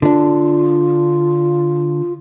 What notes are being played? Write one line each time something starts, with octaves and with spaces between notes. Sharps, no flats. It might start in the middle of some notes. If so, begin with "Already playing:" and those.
D3 D4 F4